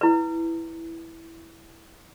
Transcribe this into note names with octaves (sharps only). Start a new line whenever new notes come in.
E4 B4